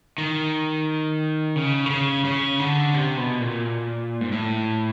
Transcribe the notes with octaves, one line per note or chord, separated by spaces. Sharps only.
D#3
C#3
D3
C#3
C#3
D3
C3
B2
A#2
G#2
A2